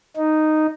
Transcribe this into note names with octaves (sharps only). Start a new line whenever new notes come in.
D#4